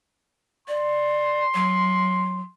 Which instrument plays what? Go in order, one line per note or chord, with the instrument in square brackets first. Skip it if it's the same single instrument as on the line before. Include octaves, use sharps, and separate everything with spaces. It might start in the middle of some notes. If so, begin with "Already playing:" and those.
[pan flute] D5 [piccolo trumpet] C6
[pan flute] F#3